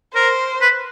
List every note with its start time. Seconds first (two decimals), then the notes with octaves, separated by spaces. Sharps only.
0.15 A#4 C5
0.62 B4